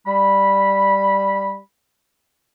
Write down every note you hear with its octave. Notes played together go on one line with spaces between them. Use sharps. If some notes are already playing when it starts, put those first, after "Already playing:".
G3 B5